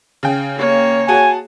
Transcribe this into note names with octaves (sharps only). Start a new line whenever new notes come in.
C#3 G5
A#3 C#5
F#4 G#4 G#5 A5